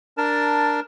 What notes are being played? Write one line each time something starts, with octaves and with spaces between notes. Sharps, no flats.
D4 A#4 A5